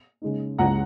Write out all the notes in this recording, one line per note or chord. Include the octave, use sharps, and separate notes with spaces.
C#3 G#3 D#4
C#2 C#3 G#3 C#4 F#5 A#5